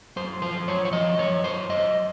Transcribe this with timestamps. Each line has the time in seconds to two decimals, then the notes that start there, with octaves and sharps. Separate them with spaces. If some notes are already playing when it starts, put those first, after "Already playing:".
0.16 F#2 C5
0.42 F3 C5
0.67 F#2 C#5
0.85 C#5
0.93 F3 D#5
1.18 F#2 C#5
1.44 F#2 C5
1.69 F#2 D#5